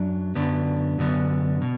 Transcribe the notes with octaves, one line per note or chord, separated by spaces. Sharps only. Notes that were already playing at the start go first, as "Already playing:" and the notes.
Already playing: F#2 F#3 D4
F#2 D3 F#3 B3 D4
F#2 D3 B3 D4
B2